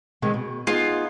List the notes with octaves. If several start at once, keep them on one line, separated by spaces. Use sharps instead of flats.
C3 D#3 G#3
B2
B3 D#4 F4 G#4